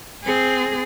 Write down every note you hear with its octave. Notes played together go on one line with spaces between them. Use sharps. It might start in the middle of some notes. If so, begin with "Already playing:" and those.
C4 G#4